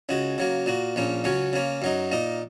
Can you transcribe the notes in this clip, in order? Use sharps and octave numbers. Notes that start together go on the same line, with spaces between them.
C#2 C#3 G#3 F#4
C#3 F#3 A#3
A#2 A#3 F#4
A#1 A#2 A#3 C#4
C#2 C#3 F#3 C#4
C#3 A#3 C#4
F#2 F#3 D#4
A#2 A#3 D#4